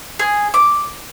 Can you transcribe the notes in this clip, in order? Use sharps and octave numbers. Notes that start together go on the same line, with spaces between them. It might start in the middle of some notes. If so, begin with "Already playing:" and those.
G#4
D6